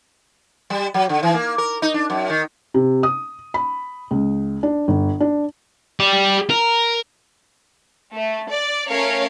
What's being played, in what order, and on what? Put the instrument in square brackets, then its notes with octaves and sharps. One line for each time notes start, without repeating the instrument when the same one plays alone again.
[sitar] G3
F#3
D3
E3
A#3
A#4
D#4
D4
F#2
D#3
[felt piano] C3
D#6
B5
C#2
D4
G1
D4
[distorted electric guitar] G4 D5
A#4
[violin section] A3
D5
A3 C#4 A#4 C#5 F5